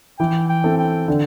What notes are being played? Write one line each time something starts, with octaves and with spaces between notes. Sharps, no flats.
E3 G5
G5
C4 E4 A4
G5
D3